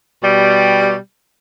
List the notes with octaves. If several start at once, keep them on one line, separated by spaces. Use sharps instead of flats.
B2 G3